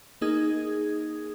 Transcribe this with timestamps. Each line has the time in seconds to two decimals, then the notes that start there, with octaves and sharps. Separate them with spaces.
0.21 A#3 D#4 G#4 D#6 G#6